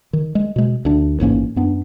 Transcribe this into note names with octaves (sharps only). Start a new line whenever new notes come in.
D#3
G#3
B2 G#3
D2 D4
A1 G#2 A#3 C#4
F#2 B3 D4